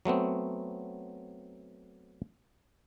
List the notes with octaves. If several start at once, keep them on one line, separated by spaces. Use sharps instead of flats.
F#3 A3 B3 C4